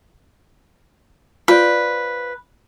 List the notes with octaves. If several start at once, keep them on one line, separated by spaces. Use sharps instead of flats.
F4 B4 C5 D5